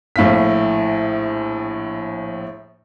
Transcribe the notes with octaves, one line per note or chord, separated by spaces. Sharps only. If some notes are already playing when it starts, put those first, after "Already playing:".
A#1 A2 F5 B6